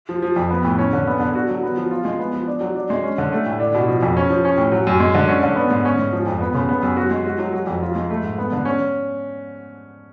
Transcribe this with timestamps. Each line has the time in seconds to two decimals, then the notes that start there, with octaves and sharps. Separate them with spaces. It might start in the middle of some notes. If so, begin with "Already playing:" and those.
0.09 F3
0.22 F3
0.36 F2
0.50 B3
0.65 A2
0.78 C#4
0.93 D3
1.07 B3
1.20 D3
1.35 F#4
1.49 F#3
1.63 B3
1.77 F3
1.91 F4
2.05 G#3
2.19 B3
2.34 F3
2.47 D4
2.61 F#3
2.76 D4
2.90 G#3
3.03 C#4
3.18 D3
3.32 A3
3.46 A2
3.60 D4
3.74 B2
3.88 F3
4.03 F2
4.17 C#4
4.30 F3
4.45 C#4
4.58 A2
4.72 F#3
4.87 F#2
5.00 G#3
5.15 D3
5.28 C#4
5.43 D3
5.56 B3
5.70 G#2
5.85 C#4
5.98 G#2
6.13 F3
6.27 F2
6.40 B3
6.54 C#3
6.69 B3
6.83 F#2
6.97 F#4
7.11 G#3
7.26 F#4
7.39 F#3
7.53 F#3
7.67 F2
7.82 F4
7.96 G#3
8.10 A3
8.23 G#2
8.38 B3
8.52 D3
8.65 C#4